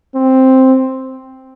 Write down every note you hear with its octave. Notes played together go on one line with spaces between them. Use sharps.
C4